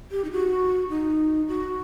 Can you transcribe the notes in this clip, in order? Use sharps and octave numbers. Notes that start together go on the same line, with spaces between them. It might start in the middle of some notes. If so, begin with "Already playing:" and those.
G4
D#4
F#4
D#4
F#4